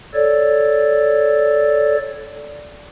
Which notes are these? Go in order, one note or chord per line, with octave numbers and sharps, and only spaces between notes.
A4 C#5 D5